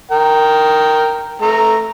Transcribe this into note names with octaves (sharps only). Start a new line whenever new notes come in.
A#4 G5
A3 A#5